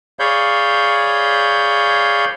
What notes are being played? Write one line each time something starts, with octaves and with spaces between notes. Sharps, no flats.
G#4 C#5 D5 F5 B5 G6